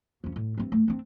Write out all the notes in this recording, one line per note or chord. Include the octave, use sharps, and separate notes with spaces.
F2 C#4
A2
G2 C4
A3
C4 D4